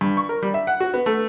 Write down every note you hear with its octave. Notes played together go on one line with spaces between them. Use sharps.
G2
C#6
A#4
G3
E5
F#5
F#4
B3
A3